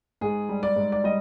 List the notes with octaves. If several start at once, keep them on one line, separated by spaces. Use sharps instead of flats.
G#2 G#4
G3
D5
G#2
D5
G3 D#5